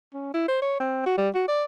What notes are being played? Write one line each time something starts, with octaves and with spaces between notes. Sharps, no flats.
C#4
E4
C5
C#5
C4
F#4
G3
F#4
D5